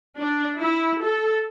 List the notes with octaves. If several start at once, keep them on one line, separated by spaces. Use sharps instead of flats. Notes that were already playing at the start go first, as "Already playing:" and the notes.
D4
E4
A4